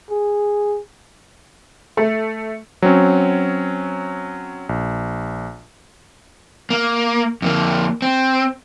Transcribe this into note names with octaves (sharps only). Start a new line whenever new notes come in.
G#4
A3
F#3 C4 C#4
A#1
A#3
F2 A#3
C4